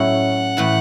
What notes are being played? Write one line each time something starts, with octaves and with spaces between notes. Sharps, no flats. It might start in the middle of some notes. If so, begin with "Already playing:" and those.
Already playing: A2 F#3 C#4 E4 F#5
A2 E3 A3 E4 B4